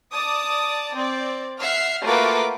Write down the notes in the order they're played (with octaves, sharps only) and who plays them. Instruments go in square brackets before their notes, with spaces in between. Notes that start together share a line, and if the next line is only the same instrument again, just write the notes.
[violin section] D5 A5 D6 D#6
C4 D5
E5 F#5 F6 C7
A3 A#3 F4 F#4 B4 D6